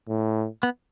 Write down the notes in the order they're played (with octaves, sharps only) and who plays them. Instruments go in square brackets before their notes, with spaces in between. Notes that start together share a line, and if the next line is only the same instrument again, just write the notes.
[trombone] A2
[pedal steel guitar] B3